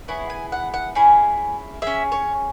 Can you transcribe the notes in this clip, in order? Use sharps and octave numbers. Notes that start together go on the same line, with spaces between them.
B3 E4 G#4 C#5
G#5
F#5
F#5
C#4 E4 G#4 G#5
C#4 G#4 E5
C#5